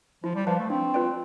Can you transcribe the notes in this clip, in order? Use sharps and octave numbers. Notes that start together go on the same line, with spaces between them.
F3 E4
G3
F3 B4 F5 A5
A3
C4 D4
F4 B4 D5 G5